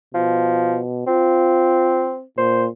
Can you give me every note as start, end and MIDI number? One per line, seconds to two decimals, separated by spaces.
0.14 1.02 47
0.14 0.79 53
1.07 2.22 60
1.07 2.15 65
2.38 2.68 46
2.38 2.65 72